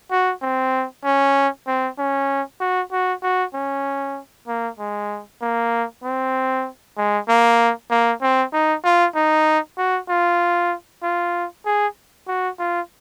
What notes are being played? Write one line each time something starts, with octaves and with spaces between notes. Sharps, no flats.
F#4
C4
C#4
C4
C#4
F#4
F#4
F#4
C#4
A#3
G#3
A#3
C4
G#3
A#3
A#3
C4
D#4
F4
D#4
F#4
F4
F4
G#4
F#4
F4